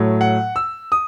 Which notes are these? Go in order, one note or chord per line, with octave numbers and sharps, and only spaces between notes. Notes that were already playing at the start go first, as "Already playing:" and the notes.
Already playing: A2 F#3 A3
F#5
E6
D#6